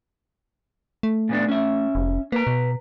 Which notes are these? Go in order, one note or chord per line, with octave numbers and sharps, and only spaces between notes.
A3
A#2 B3 D4
C#4 E5
F1
A#3 B4 A#5
B2